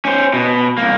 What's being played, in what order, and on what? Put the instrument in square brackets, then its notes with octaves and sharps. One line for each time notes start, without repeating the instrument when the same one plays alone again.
[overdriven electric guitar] C#4 C5
B2
C2 A#3